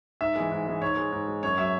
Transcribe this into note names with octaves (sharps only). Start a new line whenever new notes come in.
G#2 E5
E3 G#3
G#2
E3 G#3
G#2 C#5
G#3
G#2
G#3
F#2 C#5
F#3 E5